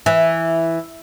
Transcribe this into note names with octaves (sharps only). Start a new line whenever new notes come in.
E3